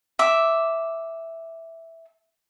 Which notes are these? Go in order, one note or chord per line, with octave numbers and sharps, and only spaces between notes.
E5 D6